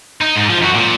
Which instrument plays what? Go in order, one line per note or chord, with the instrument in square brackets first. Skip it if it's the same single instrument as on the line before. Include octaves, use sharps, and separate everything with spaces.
[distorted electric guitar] D#4
G#2
F3
F#2 F#4
A#2